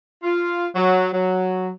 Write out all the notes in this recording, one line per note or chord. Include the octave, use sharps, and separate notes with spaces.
F4
F#3
F#3